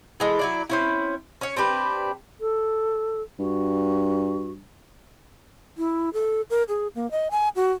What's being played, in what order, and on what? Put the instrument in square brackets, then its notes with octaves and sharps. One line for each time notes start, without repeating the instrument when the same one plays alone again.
[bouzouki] E3 G#3 A3
F#3 E4 D5
C4 C#4 E4
C#4 C#5
C4 D4 G4 B4
[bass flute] A4
[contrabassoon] G2 [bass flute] F#4
[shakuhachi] E4
A4
A#4
G#4
A#3
D#5
G#5
F#4